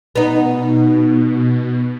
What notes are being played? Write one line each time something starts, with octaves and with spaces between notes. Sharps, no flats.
B2 B3 D#4